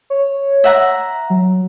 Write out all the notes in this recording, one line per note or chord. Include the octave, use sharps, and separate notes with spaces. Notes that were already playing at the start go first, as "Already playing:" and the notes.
C#5
E5 F#5 A#5
F#3